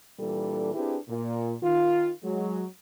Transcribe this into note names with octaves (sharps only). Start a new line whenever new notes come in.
A#2 E3 G3 D4 A4
C4 D4 E4 G4 G#4 B4
A#2
D#3 F4
F#3 G#3